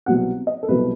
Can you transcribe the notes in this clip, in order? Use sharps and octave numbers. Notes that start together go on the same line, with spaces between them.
C2 B2 F#3 F#5
D#5
A4
C2 B2 F#3 B4